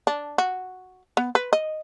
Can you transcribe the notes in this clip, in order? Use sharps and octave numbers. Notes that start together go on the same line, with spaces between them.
D4
F#4
B3
B4
D#5